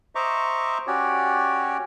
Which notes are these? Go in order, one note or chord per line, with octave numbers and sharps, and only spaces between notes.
C5 D#5 E5 A#5 C#6 D6
C#4 F#4 G4 C#5 D5